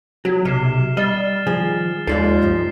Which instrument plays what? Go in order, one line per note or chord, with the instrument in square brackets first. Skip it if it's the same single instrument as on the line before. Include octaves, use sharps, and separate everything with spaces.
[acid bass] F#3 [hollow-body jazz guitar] F#4
[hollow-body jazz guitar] B1 [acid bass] C3 [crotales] F6 C7 E7
[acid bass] G3 [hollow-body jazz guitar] D#5 [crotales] F6 A6
[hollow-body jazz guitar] D#3 F3 G#4
[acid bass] D#2 [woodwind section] G#3 D#4 F4 [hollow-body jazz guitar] A4 D5 F5 [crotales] C7
[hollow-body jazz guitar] C#2 G2 F3